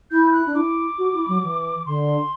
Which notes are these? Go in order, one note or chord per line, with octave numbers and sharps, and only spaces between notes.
E4 G6
G6
F#6
D4
E4 D6
F#4
E4
F#3
E3
D3 C6